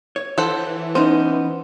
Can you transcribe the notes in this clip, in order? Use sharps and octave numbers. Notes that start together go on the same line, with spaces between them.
C#5
E3 A4 C5 F#5
B3 C#4 D#4 C5